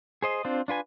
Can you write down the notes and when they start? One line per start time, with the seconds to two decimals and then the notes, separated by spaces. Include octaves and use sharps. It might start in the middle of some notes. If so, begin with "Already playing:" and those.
0.22 G#4 C5 D#5
0.44 C4 D4 F4 C5
0.68 D4 F4 B4 G#5